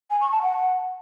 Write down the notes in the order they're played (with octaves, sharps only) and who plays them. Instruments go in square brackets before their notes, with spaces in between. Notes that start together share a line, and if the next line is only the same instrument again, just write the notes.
[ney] G#5
C#6
A5
F#5